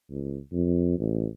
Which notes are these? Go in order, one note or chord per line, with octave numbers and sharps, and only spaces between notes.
C#2
F2
A1